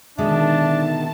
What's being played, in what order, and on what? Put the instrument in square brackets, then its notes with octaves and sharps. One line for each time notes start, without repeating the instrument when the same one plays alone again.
[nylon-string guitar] B2 D3 G#3 [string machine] D#3 A5 [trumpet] D4 [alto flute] E5